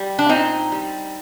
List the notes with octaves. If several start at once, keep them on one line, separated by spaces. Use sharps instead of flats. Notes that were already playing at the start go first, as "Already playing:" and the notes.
Already playing: G3
D4
A#2 C4 D#4
G3